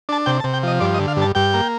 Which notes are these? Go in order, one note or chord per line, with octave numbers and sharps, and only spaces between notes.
D4 A5
C3 G5
A5
C3
G5
F3 D#5
G2 D5
D#5
D3
F5
G2 A5
G2 G5
A#3